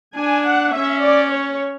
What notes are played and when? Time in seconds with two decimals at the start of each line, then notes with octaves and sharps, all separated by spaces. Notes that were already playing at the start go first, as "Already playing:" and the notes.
0.17 D4 G#5
0.46 F#5
0.74 C#4 E5
1.03 D5
1.32 C#5